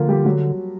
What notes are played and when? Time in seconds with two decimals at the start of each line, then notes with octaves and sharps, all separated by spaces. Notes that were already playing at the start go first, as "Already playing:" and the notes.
Already playing: D3 F3 A#3 F4 A#4
0.08 G3 G4
0.25 F#3 F#4